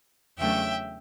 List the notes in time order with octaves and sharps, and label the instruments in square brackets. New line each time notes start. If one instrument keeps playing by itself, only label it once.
[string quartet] E2 C#3 F#3 A3 D4 E5 G5